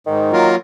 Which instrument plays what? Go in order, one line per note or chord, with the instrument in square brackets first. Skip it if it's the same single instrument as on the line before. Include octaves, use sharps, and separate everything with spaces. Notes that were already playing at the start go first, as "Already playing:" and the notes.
[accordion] G#2 [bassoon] D#3
[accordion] F#3 A#3 F4 A#4